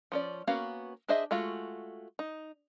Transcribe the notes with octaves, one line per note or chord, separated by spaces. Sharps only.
F3 C#4 D5
A#3 B3 C#4 F#4 F5
D4 G#4 C5 D#5 E5
G#3 A3 F4 F#4
D#4